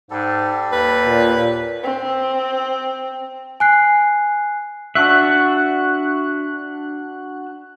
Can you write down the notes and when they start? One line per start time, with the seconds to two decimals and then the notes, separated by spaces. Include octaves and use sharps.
0.11 G#2 G3 A4
0.73 D#2 B4
1.07 A#2
1.83 C4
3.60 G#5 F#6 C7
4.95 D4 F#4 E5 F#6